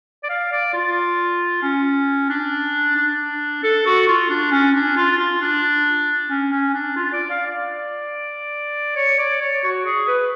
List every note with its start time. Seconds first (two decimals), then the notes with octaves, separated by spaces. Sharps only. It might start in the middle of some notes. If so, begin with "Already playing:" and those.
0.24 D5
0.30 F5
0.52 D5
0.74 F4
1.63 C#4
2.30 D4
2.96 D4
3.64 A4
3.86 F#4
4.07 F4
4.30 D4
4.52 C#4
4.75 D4
4.97 F4
5.19 F4
5.41 D4
6.30 C#4
6.52 C#4
6.74 D4
6.96 F4
7.13 D5
7.30 F5
7.46 D5
8.96 C#5
9.19 D5
9.41 C#5
9.64 F#4
9.86 G#4
10.08 B4